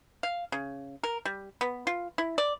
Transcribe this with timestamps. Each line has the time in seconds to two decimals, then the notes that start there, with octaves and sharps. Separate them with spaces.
0.23 F5
0.52 C#3
1.03 A#4
1.25 G3
1.61 B3
1.87 F4
2.18 E4
2.38 D5